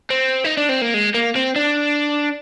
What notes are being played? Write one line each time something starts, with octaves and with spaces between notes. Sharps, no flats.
C4
D#4
D4
C4
A#3
G#3
A#3
C4
D4